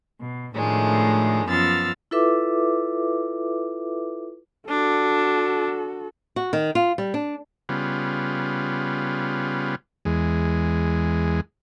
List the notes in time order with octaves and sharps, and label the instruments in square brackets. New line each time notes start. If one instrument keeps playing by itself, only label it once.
[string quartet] B2
A2 D#3 F3 G#3 A3 D4
F#2 F3 B3 E6 F6 A6
[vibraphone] E4 F4 A4 B4 E5 D6
[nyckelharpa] D4 [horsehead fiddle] F#4 A4
[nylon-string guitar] F#4
D#3
F4
G3
D4
[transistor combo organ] C#3 G3 B3 F4
E2 G#3